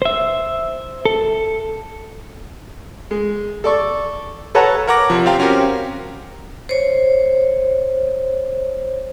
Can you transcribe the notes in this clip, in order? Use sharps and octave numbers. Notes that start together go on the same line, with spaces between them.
C5 E5
A4
G#3
A4 D5 C#6
A4 B4 C#5 F#5 A5 A#5
A#4 C#5 F#5 A#5 D6 A#6
C3 F3
C4 F4 G4 F5 G5 A#5
C4 C#4 F#4 G4 A#4
C5 C#5